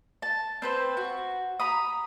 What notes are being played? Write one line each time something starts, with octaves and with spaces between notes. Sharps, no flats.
A5
C4 B4 C5
F#4
A#5 B5 D#6